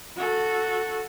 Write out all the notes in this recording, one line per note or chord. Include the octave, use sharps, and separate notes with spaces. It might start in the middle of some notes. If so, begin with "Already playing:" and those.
F#4 A4